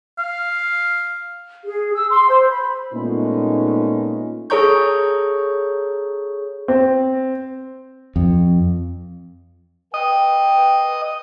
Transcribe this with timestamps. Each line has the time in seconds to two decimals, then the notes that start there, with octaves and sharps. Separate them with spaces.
0.19 F5
1.65 G#4
1.95 E6
2.10 C6
2.28 C5
2.49 B5
2.93 A#2 G#3 A3 B3 C#4 D#4
4.50 G#4 A4 C#5 A#5 C#6 G6
6.68 C4
8.16 F2
9.94 B4 D#5 G5